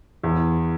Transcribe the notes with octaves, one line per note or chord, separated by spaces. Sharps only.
E2